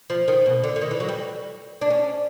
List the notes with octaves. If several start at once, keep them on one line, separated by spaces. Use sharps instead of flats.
F3
D#3
B2
D3
D3
D#3
E3
F#3
G3
D4
C#4